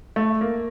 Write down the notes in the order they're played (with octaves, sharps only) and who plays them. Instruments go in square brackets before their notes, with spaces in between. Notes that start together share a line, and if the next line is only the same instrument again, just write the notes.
[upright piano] A3
A#3